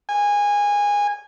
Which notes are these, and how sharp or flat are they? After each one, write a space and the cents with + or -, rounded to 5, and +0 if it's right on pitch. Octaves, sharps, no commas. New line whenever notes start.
G#5 -20